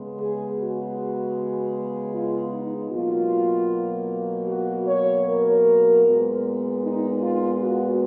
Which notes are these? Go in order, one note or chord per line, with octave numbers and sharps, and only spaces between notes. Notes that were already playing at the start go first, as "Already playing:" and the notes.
Already playing: C#3 G#3 B3
G#4
F#4
F4
D#4
B2 F#3 A#3 F4
F#4
C#5
A#4
A#2 G#3 B3
D#4
F4
F#4